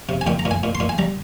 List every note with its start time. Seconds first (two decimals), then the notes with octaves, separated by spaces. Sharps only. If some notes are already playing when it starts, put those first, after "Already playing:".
0.09 C3
0.21 G#5
0.27 A#2 G5
0.39 A#5
0.45 A#2
0.51 G#5
0.63 A#2
0.75 C6
0.80 A#2
0.89 G#5
0.98 G3 A#5